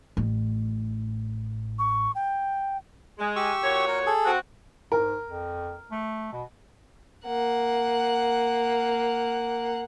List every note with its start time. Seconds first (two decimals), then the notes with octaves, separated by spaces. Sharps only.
0.17 A1 A2
1.79 C#6
2.15 G5
3.18 G#3
3.36 G4 C#6 E6
3.63 A#2 F#4 C#5
3.88 A#4
4.06 G#4 A4
4.25 C4 F#4
4.92 G#2 A#4
5.28 F2
5.91 A3
6.33 B2
7.25 A#3 F#5